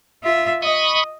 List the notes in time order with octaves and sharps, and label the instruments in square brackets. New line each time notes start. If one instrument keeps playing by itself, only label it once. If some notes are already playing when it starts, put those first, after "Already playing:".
[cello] F4 E5
[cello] D#5 [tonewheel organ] B5 C#6 D#6